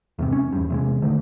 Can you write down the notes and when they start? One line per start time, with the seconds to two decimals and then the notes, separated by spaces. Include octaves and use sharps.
0.19 E2 G#2 C3
0.33 C#4
0.52 E2 G2
0.70 E2 C3 G#3
1.02 D3 D#3 A3